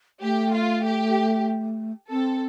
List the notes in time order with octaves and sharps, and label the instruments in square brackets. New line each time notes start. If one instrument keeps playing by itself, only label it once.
[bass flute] A3 [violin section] G4
[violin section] F4
G4
[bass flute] C4 [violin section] A4